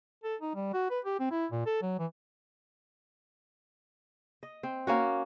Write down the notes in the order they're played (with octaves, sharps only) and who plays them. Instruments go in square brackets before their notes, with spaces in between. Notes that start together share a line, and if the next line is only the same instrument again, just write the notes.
[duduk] A4
D#4
G3
F#4
B4
G4
C4
E4
A#2
A4
F#3
E3
[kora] D#5
C4
A#3 C#4 F#4